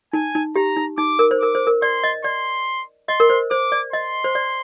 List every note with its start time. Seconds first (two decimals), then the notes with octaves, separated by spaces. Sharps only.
0.13 D#4 G#5
0.35 D#4
0.56 G4 A#5
0.77 D#4
0.98 D#4 D6
1.19 A#4
1.31 C5
1.40 A#4 D6
1.55 C5
1.67 A#4
1.82 D5 C6
2.04 D#5
2.24 D5 C6
3.08 D#5 C6
3.20 A#4
3.30 C5
3.51 C5 D6
3.72 D5
3.93 D#5 C6
4.24 C5
4.35 D5